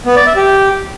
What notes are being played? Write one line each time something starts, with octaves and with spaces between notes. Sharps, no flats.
B3
D5
E5
G4